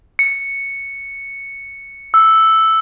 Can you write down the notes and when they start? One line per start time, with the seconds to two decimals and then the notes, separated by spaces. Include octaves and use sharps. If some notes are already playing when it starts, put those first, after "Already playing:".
0.19 C#7
2.14 E6